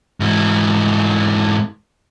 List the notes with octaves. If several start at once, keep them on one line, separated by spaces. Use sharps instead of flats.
G#2 E3